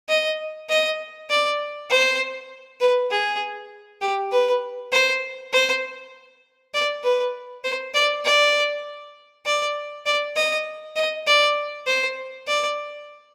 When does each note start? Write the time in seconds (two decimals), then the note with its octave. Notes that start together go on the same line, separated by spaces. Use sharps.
0.08 D#5
0.69 D#5
1.29 D5
1.90 C5
2.80 B4
3.10 G#4
4.01 G4
4.32 B4
4.92 C5
5.53 C5
6.74 D5
7.03 B4
7.64 C5
7.94 D5
8.25 D5
9.45 D5
10.06 D5
10.36 D#5
10.96 D#5
11.27 D5
11.86 C5
12.47 D5